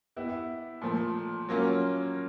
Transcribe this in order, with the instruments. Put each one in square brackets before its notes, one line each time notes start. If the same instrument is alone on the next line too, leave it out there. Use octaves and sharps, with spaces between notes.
[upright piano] B3 E4 G4
A#2 F3 A3
F#3 A#3 C#4 F4